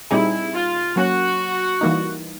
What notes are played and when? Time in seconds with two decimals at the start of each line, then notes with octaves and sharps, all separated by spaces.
0.11 A#2 G3 C4 D#4 E4 G#4
0.54 F4
0.96 F#3 A#3 C#4 F#4
1.81 E3 G3 A#3 D#4